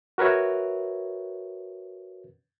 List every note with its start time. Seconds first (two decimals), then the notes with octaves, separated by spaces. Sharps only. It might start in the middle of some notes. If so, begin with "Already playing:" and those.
0.18 F#4 A#4 B4 C#5 E5